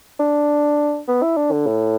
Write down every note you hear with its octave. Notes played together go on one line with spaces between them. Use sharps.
D4
B3
E4
D4
D3
A2